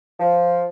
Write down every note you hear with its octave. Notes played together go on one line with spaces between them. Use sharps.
F3